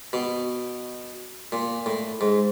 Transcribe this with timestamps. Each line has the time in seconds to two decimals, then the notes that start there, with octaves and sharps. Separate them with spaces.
0.13 B2
1.52 A#2
1.86 A2
2.21 G#2